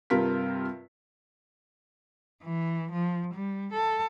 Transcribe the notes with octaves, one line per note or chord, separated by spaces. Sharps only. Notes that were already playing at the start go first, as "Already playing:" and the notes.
G2 C3 F4 A#4 B6
E3
F3
G3
A4